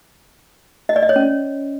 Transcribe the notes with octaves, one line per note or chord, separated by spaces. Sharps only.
D#5
D5
D#5
C#5
C#4